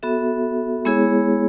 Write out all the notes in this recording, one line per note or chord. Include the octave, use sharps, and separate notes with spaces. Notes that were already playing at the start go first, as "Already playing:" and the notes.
B3 F#4 A4 E5
G#3 B3 E4 G#4 C#5